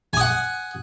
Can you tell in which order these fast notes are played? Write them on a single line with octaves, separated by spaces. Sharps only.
G#5 D#6 F#5